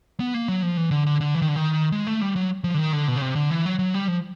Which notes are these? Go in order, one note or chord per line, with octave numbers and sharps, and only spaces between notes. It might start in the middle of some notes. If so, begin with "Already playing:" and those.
B3
A#3
F#3
F3
E3
D3
D3
D3
E3
D#3
D3
D#3
G#3
A3
G3
F#3
F3
D3
D#3
D3
B2
C#3
C3
D3
E3
F#3
F#3
G3
F3